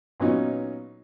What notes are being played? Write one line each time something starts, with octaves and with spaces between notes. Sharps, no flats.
A#2 F#3 B3 C#4 D#4